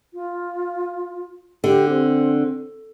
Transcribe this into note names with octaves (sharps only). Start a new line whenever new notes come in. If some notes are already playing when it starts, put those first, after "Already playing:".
F4
D3 G4
C4